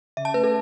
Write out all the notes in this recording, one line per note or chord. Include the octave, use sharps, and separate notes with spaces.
C#3 E5
A5
A3 B4
A4